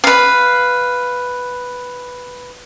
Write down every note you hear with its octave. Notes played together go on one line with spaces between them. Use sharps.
B4 F5